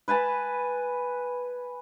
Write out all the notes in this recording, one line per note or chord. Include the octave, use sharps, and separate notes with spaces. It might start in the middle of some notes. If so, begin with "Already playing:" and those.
B4 G#5 A5 B5